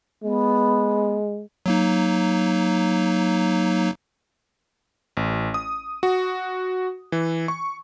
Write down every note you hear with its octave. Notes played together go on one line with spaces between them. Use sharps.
G#3 B3
F#3 A#3 D#4
A1
D#6
F#4
E3
C#6